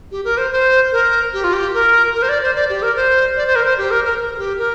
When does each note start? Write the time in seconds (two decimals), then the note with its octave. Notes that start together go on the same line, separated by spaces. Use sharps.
0.12 G4
0.25 A#4
0.37 C5
0.51 C5
0.92 A#4
1.33 G4
1.44 F4
1.53 G4
1.74 A#4
2.15 A#4
2.22 C5
2.29 D5
2.42 C5
2.55 D5
2.70 G4
2.82 A#4
2.96 C5
3.37 D5
3.47 C5
3.56 A#4
3.66 C5
3.78 G4
3.91 A#4
4.05 A#4
4.19 A#4
4.34 A#4
4.39 G4
4.59 A#4